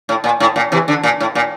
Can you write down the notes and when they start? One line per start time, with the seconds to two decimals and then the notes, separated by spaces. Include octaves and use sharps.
0.09 A2
0.24 A#2
0.40 A2
0.56 A#2
0.72 C3 E3
0.88 D3
1.04 A#2
1.20 A2
1.35 A#2